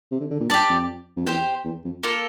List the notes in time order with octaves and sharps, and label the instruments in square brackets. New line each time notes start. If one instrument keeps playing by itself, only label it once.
[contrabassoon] C3
D3
D3
A#2
[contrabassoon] G2 [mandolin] G4 D5 A5
[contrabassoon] F2
F2
[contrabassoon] E2 [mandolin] G4 C5 G5
[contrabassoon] E2
F2
[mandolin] A#3 F4 A4